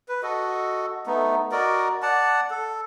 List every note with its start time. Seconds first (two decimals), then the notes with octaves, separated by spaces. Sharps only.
0.08 B4
0.23 F#4 A4 D#5
1.06 A3 B3 D#4
1.52 F#4 A#4 D5 D#5
2.02 D5 F#5 A5
2.50 A4